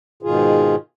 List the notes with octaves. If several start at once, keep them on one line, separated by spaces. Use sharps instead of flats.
G#2 B2 D#3 F4 G#4